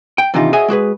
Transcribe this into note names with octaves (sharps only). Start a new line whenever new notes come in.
G5
C3 D#3 E3 D4 D#4 F4
F#4 G#4 C#5 D#5 E5 G#5
G#3 F#4 G#4 B4